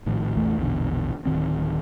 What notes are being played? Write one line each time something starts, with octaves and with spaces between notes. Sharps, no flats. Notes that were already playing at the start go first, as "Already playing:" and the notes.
A#1 A2 D#3 F3
A#1 F2 E3 A3
A#1 E2 B2 D3
D1 D#2 D#3 C4